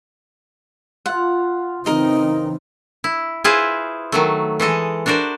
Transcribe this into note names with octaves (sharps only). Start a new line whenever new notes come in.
F4 F5 F#5
C#3 E3 C4 D#4 A#4 D#5
E4
E4 F4 G#4 B4 C5
D#3 F#3 A3
E3 G#3 A4 D#5
D4 F#4 A#4 C5 D5